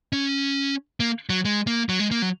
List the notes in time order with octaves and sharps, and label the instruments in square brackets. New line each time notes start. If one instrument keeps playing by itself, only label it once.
[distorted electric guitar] C#4
A#3
F#3
G#3
A#3
F#3
G#3
A#3
F#3